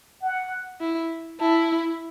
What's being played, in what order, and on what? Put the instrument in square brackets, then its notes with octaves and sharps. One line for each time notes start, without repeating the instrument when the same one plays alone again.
[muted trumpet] F#5
[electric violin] E4
[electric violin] E4 [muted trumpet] A5